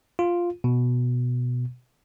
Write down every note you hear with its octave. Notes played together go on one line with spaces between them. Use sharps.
F4
B2